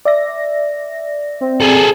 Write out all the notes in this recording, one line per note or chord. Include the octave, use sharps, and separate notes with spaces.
D5 E5 A#6
C4
G#4 A4